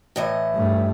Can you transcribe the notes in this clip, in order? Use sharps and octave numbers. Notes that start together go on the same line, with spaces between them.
A2 E3 D#5
G2 A3